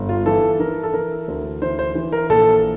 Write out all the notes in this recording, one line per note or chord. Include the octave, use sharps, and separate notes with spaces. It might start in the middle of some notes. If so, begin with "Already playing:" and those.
Already playing: G1
F4
E3 A4
E3 A#4
A4
E3 A#4
D2
E3 C5
C5
E3
A#4
A#1 A4